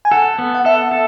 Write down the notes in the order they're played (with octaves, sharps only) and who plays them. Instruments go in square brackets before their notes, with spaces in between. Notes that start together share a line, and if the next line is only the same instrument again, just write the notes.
[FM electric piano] G#5
[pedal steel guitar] A4 [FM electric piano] F#5
[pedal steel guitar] B3
[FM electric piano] F#5
[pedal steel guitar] A4 [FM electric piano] E5
[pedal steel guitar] A4